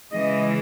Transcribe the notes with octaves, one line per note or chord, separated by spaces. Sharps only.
C#3 E3 G#3 D#5